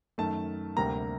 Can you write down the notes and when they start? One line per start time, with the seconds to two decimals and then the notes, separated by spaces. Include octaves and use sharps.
0.18 F#2 D#3 A3 A5
0.76 D2 C3 G3 A#3 A#5